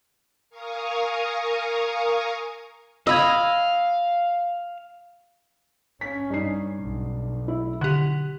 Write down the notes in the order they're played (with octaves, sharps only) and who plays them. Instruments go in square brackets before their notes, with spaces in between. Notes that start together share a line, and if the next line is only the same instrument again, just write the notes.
[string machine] A#4 F5 G#5 A#5 C#6 D#6
[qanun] D#5 B5 [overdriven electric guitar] F5 [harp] E6 G#6
[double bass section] C#4 [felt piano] B6
[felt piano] G2 D#4 C7
[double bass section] B1
[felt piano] E4
[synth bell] D3 G4 [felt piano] F#6